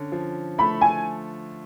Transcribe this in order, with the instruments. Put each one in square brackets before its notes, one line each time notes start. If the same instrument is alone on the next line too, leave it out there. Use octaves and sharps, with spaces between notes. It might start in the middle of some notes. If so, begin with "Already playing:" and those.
Already playing: [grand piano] D3 C#4
F3
[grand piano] A3 [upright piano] B5
[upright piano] G#5